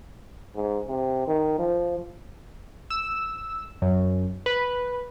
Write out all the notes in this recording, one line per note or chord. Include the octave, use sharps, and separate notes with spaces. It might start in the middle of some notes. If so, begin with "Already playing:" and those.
G#2
C3
D#3
F3
E6
F#2
B4